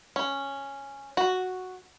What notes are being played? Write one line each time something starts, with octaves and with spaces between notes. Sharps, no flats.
C#4
F#4